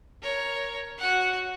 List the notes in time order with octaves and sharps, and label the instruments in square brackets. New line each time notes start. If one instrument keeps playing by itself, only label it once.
[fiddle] A#4 C#5
F#4 F#5